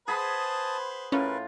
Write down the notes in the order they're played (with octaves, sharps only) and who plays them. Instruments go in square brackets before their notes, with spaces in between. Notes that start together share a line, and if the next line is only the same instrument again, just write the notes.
[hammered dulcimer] G#4 F#5 B5 [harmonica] B4 C5 [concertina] A5 D#6
[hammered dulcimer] A2 F4 [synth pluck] C#4 [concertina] A#4 B4